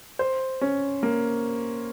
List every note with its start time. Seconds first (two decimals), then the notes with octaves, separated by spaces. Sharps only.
0.19 C5
0.61 C#4
1.03 A#3